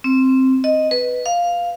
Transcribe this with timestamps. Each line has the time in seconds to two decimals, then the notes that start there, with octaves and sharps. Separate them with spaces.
0.04 C4
0.64 D#5
0.91 B4
1.26 F5